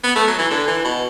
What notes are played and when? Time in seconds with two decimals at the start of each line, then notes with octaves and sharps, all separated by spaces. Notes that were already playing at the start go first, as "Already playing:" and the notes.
0.03 B3
0.16 A3
0.27 F#3
0.38 E3
0.51 D3
0.67 E3
0.84 B2